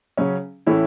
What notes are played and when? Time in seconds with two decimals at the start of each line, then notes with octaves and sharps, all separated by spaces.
0.17 C#3 F#3 C#4
0.66 A2 E3 A3 C#4 E4